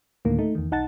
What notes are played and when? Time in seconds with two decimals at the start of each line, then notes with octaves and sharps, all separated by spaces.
0.25 D2 A2 D3 D#3 A#3
0.38 A3 D#4
0.55 E2 D#3
0.71 B1 D#4 F#5 A5 A6